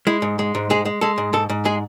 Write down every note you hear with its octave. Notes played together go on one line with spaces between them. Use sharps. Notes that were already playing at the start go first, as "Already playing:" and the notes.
G#3 E4
G#2
G#3
G#2
G#3 G#4
G#3
G#3 A4
G#2
G#2 A4
G#2
G#3 G#4